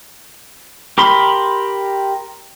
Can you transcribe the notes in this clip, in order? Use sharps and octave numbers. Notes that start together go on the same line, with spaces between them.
G4 A#4 B5 C6